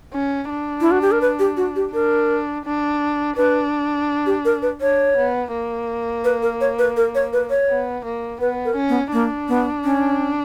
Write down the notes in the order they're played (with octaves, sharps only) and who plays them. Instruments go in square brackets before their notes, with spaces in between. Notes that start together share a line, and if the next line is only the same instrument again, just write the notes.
[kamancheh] C#4
D4
[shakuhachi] E4
F#4
G4
A#4
B4
G4
F#4
G4
[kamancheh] D4 [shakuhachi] A#4
[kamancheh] D4
[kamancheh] D4 [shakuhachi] B4
[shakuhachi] G4
A#4
B4
[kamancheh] D4 [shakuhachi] C#5
[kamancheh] B3
A#3
[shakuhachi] B4
A#4
C#5
B4
A#4
C#5
B4
C#5
[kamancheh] B3
A#3
[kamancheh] B3 [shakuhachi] B4
[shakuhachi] A#4
[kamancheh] C#4
[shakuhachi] B3
[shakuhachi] A#3 [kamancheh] D4
[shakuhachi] B3
C#4